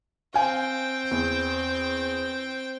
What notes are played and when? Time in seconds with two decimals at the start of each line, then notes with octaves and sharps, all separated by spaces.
0.34 C4 F5 G5 G#5
1.11 E2